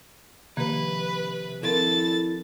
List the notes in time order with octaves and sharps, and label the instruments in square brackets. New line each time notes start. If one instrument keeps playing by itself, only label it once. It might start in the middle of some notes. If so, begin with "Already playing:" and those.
[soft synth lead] C3 [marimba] D#3 F3 A#3 [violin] B4
[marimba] F3 C4 A#4 [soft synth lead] E4 [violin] A4 A6